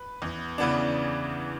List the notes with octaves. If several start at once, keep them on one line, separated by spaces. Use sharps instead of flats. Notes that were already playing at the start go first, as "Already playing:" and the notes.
Already playing: B4
E2
C#3 E3 B3 D4